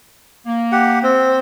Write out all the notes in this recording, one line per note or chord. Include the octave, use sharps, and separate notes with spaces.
A#3
G4 F#5
C4